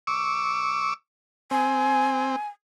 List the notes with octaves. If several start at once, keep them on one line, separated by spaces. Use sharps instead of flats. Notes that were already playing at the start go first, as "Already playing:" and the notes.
C#6 D6 E6
C4 G#5